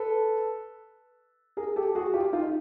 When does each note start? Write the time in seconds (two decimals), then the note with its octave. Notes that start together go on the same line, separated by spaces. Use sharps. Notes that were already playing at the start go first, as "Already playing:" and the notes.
Already playing: A4 B4
1.57 G#4 A#4
1.76 G4 A4
1.95 F#4 G#4
2.14 F4 G4
2.33 D#4 F4